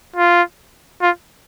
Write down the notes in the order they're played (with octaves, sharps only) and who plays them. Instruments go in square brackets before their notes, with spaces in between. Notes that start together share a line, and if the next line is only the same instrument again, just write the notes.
[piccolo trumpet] F4
F4